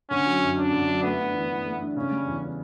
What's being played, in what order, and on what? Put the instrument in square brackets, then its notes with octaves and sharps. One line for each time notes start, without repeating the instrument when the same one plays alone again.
[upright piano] D3 [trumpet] C#4
[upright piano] F#3
F#2
[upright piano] C#4 [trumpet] D4
[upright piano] D3
F#3
[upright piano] A3 [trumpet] B3
[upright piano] D4
E3
E3
A3
D4
[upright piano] C#3 [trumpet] C#4
[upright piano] G3
E2
C#4